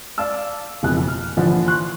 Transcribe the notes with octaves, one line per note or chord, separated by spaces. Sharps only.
D5 F5 A5 E6
F#1 B1 F2 G#4 F#6
F6
A#1 D3 E3 F3
C6 C#6 F#6